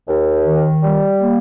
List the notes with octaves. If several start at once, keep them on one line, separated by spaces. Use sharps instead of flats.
D#2
D#3
G3
A#3